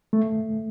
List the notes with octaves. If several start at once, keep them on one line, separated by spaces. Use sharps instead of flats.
A3